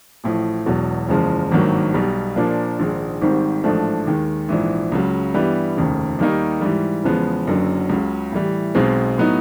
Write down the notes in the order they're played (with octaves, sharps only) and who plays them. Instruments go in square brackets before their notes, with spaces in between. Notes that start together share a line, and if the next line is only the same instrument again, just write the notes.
[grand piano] A1 A2 F3
E1 E2 B2 F#3
F#1 E2 C#3 F3 G#3
G#1 G2 D#3 F#3 A#3
B1 B2 G3
A#2 F3 A#3 D4
A#1 G#2 D#3 G#3
G#1 G#2 D#3 G3 C4
A1 G#2 F3 A3 D4
D#2 D#3 G#3
A#1 G#2 E3
C#2 C#3 F#3
G2 E3 G3 B3
F1 D#2 C#3
D#2 D#3 G3 A#3 D#4
G#2 E3 G3
E2 C#3 F3 G#3 B3
F#1 F#2 D3 F#3
C#2 C#3 F#3
A2 E3 G3
B1 B2 G#3 C4
A2 F#3 B3 D#4